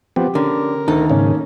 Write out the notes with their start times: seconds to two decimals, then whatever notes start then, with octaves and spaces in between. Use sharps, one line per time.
0.16 F3 B3 C4 G4
0.35 D3 C#4 A#4
0.88 D2 D#3 D#4 A4
1.10 G#2 C#3 A#3 C#4